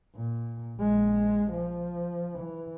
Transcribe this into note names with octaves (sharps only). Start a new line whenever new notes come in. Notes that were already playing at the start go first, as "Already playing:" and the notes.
A#2
A#1 G#3
F3
E3